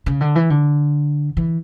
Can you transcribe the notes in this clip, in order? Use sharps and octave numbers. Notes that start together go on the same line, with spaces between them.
C#3
D3
E3
D3
E3